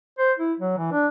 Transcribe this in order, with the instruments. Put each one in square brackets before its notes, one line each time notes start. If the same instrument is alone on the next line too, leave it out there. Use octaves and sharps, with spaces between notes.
[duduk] C5
E4
F#3
E3
D4